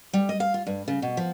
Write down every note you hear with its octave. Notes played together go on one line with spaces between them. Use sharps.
G3
D#5
F5
F4
G2
C#3
B2
F3